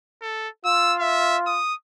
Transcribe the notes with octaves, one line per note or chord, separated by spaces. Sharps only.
A4
F4 E6
E5
D#6